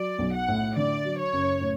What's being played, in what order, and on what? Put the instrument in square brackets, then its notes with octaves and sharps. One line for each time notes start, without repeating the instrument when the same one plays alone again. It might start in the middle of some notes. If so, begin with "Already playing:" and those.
Already playing: [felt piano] F#3 [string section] D5
[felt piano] B1
[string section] F#5
[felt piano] A2
[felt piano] D3 [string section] D5
[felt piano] F#3
[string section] C#5
[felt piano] F#1
A2